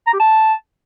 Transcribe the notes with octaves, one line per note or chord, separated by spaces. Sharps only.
A#5
G4
A5